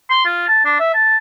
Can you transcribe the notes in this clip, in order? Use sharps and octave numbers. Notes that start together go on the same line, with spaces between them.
C6
F4
A5
D4
E5
A5